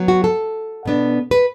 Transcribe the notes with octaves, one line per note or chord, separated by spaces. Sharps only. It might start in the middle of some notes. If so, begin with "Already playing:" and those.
Already playing: F#3 B3
F#4
A4
B2 B3 D4
B4